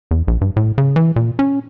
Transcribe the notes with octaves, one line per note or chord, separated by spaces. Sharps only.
E2
A#1
G2
A2
C#3
E3
A#2
C#4